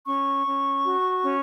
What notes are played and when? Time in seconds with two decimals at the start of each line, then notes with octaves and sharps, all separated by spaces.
0.06 C#4 C#6
0.46 C#4
0.84 F#4
1.24 C#4